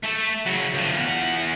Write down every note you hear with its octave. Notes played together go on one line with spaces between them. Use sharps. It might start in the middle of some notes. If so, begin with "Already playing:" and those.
A3 A4
C#3 F#3
D2 F3
E2 F#5